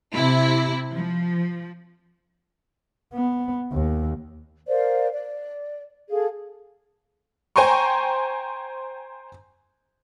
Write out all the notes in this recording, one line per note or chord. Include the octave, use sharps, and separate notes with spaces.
C3 E4
F3
B3
D#2
A#4 C5 D5 F5
D5
G#4 A4 F5
C5 G5 G#5 A#5 C6 C#6